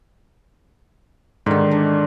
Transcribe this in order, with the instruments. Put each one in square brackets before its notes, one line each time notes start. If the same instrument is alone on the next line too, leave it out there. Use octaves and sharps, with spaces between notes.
[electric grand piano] G#2 D#3 [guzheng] D3 D#4
[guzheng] D4